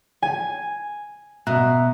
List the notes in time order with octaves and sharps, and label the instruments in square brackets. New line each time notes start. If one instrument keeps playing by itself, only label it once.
[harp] G#5
[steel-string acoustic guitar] B2 [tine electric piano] E5 A#5 F#6